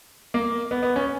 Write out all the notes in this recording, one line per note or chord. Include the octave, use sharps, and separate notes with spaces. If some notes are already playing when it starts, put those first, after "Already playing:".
A#3
B3
B3
C#4